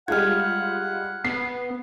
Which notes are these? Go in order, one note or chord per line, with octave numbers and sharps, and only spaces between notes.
G3 G#3 F4 F#5 F6 G#6
B3 C7